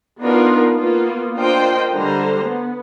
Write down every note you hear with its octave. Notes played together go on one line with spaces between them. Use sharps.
B3 D4 D#4 F4 A#4
A#3 B3 F4
D4 F4 A#4 C5 D#5 G5
D3 G3 C5 A#5
B3